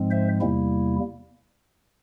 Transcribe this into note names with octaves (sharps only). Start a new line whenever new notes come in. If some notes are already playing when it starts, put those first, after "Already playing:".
Already playing: G#2 F3 G#3 C4
C5 E5
E2 C3 G3 A#3 E4